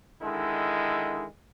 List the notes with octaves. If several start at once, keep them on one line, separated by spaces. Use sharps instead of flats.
D3 D#3 G#3 E4